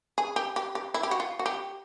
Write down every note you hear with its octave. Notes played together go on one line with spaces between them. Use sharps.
G#4
G4
G4
G4
E4
G4
F#4
F4
F#4
G4